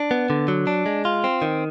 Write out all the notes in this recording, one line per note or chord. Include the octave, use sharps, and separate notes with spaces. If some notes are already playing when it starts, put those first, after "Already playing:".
Already playing: D4
B3
D3
F#3
D4
G#3
F4
C4
D#3